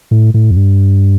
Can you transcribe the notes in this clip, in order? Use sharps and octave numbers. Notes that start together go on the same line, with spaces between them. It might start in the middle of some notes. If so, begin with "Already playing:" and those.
A2
A2
F2
G2